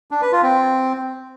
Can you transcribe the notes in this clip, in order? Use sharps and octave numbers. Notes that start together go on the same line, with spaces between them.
D4
B4
F4
C4